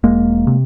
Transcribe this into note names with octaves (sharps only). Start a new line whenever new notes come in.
E1 G#3 A#3
C3